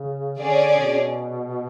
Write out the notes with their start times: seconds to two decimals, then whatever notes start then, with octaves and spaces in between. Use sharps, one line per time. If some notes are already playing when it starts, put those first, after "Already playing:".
Already playing: C#3
0.39 D3 C#4 G#4 D5
0.78 B2